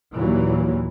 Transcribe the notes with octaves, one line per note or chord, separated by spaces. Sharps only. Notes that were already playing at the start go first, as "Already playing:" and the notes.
D#2 A#2 E3 F#3